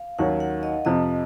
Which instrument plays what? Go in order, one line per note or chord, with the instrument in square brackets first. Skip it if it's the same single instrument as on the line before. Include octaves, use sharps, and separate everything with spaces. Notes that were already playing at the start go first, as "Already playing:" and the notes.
Already playing: [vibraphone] F5
[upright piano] D#2 D#3 F#3 C#4 [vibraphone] F#5
[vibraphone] F#5
D#5
[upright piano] F2 C3 F3 [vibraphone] D#5